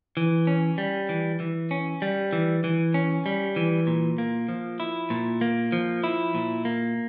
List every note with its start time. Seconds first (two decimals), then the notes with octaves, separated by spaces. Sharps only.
0.17 E3
0.47 C#4
0.78 G3
1.09 E3
1.40 E3
1.71 C#4
2.02 G3
2.33 E3
2.64 E3
2.94 C#4
3.26 G3
3.56 E3
3.87 A#2
4.18 A#3
4.49 F3
4.80 E4
5.10 A#2
5.41 A#3
5.72 F3
6.04 E4
6.35 A#2
6.65 A#3